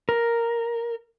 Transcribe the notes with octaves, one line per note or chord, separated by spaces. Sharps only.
A#4